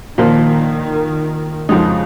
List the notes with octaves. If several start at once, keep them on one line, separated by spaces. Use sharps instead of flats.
A#2 D#3 F3 A#3
F2 C#3 F3 G#3 D#4